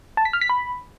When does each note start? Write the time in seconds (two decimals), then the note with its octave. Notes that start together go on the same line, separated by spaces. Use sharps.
0.17 A5
0.25 B6
0.33 F6
0.41 B6
0.49 B5